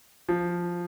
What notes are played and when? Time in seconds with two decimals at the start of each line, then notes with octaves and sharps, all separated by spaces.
0.29 F3